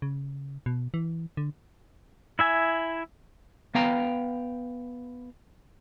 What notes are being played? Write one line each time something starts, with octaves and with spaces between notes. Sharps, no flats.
C#3
B2
E3
D3
E4 E5 G#5
B3 F5 G5 A#5